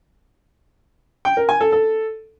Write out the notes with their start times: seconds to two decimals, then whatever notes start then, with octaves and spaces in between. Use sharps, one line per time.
1.25 G5
1.37 A#4
1.49 G#5
1.61 A4
1.72 A4